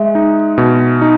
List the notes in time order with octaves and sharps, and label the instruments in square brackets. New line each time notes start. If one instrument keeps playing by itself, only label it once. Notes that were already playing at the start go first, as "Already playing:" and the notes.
Already playing: [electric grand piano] G#3 [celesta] E5
[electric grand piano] D#4
B2
D#4